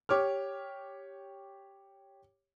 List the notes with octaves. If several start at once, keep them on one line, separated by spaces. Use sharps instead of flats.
G4 C#5 D6 F6